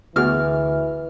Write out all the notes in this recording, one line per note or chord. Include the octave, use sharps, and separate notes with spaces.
D2 E3 B3 F#4 G#4 F6